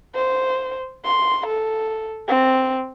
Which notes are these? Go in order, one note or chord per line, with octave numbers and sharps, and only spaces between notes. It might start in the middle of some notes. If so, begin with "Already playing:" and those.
C5
C6
A4
C4